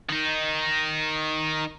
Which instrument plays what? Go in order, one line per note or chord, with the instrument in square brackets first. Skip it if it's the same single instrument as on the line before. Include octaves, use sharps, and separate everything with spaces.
[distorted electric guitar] D#3 D#4